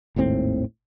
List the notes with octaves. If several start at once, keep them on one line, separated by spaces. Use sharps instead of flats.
G#1 D#2 A2 C4